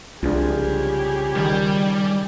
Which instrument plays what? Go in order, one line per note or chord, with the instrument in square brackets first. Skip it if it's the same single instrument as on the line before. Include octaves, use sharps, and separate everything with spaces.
[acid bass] C2 [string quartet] C#3 G4 G#4 [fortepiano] F3 G#3 D4
[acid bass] D#3 [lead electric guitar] G3